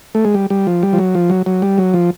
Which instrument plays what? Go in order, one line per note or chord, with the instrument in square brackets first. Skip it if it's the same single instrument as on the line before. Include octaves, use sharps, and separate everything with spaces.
[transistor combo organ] A3
G#3
G3
G3
F3
G3
F3
F#3
F3
F#3
F#3
G3
F#3
F3